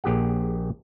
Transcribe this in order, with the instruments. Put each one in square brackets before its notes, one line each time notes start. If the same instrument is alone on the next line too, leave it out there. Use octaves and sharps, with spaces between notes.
[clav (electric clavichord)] A#1 G4 G#4 F#5